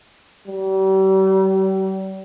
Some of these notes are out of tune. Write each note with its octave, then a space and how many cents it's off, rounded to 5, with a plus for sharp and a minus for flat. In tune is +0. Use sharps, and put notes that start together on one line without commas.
G3 -40